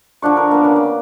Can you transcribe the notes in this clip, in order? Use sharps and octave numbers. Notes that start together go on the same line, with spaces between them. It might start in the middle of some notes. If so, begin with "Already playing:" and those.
D3 F3 D4 C#6
A#4
A#3 B3
C#3
D5